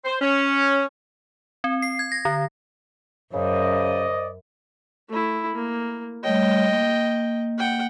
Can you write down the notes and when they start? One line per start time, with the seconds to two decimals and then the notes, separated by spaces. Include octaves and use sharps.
0.04 C5
0.20 C#4
1.64 C4
1.82 C7
1.99 G#6
2.12 A#6
2.25 D3
3.33 F#2 C#3 C5 D5 D#5
5.09 A3 E4
5.55 A#3
6.24 G3 A3 C#5 D#5 G5
6.70 A#3
7.59 F#5 G5